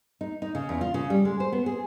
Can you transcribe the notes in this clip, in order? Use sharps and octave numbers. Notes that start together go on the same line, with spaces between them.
D#4
D#4
C#3
E2
F4
C#3
G3
G#3
C5
B3
G#4